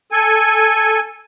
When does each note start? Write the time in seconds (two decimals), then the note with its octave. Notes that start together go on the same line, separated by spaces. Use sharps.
0.12 A4 G#5